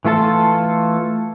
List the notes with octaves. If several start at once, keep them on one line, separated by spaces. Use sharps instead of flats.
E3 A3 F4 A4 A5